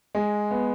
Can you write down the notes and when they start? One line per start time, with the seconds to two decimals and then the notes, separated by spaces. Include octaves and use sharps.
0.15 G#3
0.51 B3